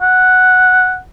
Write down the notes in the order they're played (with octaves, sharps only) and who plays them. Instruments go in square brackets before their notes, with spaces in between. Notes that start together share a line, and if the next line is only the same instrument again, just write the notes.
[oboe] F#5